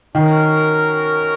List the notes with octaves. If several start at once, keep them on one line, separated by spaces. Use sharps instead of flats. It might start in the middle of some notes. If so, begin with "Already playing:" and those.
D#3 C#4 F#4 A#4